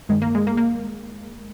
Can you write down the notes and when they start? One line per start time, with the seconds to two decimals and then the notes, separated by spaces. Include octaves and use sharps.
0.09 G2 D#3 G#3
0.22 A#3
0.35 G#3
0.47 A#3
0.57 A#3